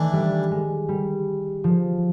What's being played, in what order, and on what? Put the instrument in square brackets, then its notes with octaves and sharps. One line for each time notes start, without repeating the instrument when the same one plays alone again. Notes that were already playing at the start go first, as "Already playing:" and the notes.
Already playing: [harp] D#3 [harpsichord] E3 A3 D4
[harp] G3
G#3
G3
F3